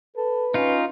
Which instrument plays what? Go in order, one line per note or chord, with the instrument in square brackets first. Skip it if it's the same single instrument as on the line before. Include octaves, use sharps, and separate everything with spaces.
[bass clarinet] A4 [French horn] B4
[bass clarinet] C#4 [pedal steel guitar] D#4 F4